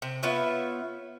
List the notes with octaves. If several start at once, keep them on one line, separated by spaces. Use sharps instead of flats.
C3
B3 F4 C#5 E5